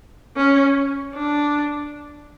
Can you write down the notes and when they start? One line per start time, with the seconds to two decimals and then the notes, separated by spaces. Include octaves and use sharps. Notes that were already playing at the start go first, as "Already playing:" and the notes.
0.36 C#4
1.14 D4